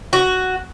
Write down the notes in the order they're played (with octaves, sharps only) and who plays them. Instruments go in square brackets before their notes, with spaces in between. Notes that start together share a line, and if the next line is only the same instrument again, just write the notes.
[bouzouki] F#4